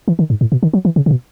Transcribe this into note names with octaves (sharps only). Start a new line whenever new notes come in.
E3
D#3
G#2
A2
B2
D#3
F#3
E3
C#3
C#3
B2